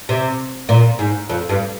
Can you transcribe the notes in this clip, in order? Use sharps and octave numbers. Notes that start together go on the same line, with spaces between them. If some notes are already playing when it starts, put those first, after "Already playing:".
C3
A#2
G#2
F2
G2